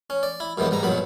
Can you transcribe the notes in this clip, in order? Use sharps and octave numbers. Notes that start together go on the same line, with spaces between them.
C#4
D5
E4
F#2 C3 E3 G#3 B3
G#2 G3 A#5
A#1 G2 B2 F#3 B5